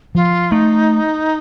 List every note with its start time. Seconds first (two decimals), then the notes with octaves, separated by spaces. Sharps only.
0.15 F3 F4
0.51 A3 D#4